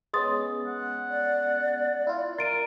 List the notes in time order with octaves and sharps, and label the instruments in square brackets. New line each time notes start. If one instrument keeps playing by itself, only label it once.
[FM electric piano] G#3 B3 C#4 [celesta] C6 D#6 A6
[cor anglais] F#5
[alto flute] D5
[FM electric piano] E4 F4
[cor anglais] A#4 [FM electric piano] C6 [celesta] A6 D7 D#7